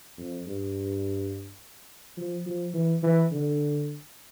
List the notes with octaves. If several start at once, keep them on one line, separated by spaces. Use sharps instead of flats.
F2
G2
F3
F3
E3
E3
D3